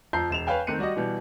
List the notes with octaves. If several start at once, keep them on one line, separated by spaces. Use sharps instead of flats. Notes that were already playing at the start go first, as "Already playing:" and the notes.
F2 F3 A#5 G6 C7
E1 E7 F7
B4 C#5 F5 G5 G#5
D#3 A3 C4 F#6 C#7 D#7
G3 F#4 D5 D#5
B2 E3 G3